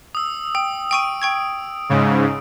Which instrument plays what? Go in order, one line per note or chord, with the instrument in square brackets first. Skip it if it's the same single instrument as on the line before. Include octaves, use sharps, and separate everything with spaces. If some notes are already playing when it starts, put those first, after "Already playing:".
[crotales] D#6 E6
[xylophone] G5 [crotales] D#6
[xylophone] G5 C#6 D#7 [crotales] D7
[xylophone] G5 C#6 G#6
[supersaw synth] G#2 C#3